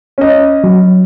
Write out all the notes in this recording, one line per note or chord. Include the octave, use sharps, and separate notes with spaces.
C#4 D#5
F#3